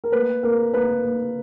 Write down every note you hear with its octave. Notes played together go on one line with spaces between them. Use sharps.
A#4
A#3 B4
A#3 A#4
A#3 B4
A#3